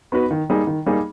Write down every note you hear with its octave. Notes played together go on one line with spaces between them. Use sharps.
B3 D#4 F#4 B4
D#3
G3 A#3 D#4 G#4
D#3
G3 A#3 D#4 G#4